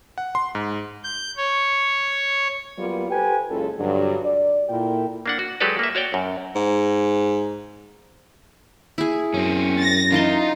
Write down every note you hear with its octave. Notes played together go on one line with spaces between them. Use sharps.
F#5
C6
G#2
G6
C#5
F#3 G3 A#3 B3 F4
G4 A4 B4 C5 G5 G#5
F#1 C#3 G#3 F4 A4
G2 D3 F#3
D5
A#2 E4 F4 A4 A#4 G5
A#3 D4 F#5
F#4
F#3 G#3 G4 A4 B4 D5
A#3 E5
F#4 C#5 D5 G5
F#2
G#2
E4 G#4
F#2 C4 C#4
A6 A#6
E3 D#4 F4 A5 C6